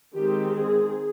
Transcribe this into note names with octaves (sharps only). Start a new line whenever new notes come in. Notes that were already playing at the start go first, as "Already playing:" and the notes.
D#3 G#3 C4 G4
G#4